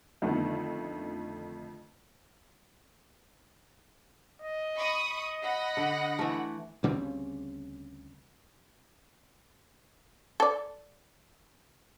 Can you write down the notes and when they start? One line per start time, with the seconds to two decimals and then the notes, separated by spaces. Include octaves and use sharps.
0.22 F2 D3 D#3 F3 A3 B3
4.42 D#5
4.76 B5 C#6 D#6
5.12 D#5
5.43 F#5 B5 A#6
5.77 D3
6.19 E3 A3
6.83 D2 C#3 G3 C4
10.40 A4 D5